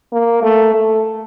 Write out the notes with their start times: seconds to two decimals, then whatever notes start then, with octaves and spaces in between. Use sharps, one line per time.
0.12 A#3
0.43 A3
0.74 A3